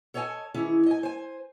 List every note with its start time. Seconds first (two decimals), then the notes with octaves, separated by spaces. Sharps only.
0.14 A4 C#5 D#5 F#5 G#5 A5
0.54 D#3 E3 C#4 E4 G#4
0.86 D#5 G#5
1.03 C5 G#5